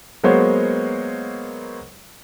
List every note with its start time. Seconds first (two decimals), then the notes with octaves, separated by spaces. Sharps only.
0.24 F#3 G#3 A#3 B3 C5 C#5